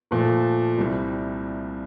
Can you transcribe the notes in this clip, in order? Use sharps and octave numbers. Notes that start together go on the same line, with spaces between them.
A#2 F3 A3
C2 C3 G3